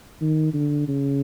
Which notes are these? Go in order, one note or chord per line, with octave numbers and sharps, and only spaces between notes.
D#3
D3
C#3